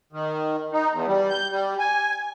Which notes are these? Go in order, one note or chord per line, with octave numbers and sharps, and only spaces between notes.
D#3
D#4
E2
G3
G6
G3
G#5